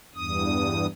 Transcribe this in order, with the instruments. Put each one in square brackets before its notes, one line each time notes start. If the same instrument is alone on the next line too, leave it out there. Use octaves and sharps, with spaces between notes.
[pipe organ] E2 G2 D#6